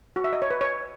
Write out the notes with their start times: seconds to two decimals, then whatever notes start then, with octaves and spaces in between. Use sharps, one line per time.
0.16 F#4
0.24 E5
0.33 D#5
0.42 C#5
0.50 B4
0.61 C#5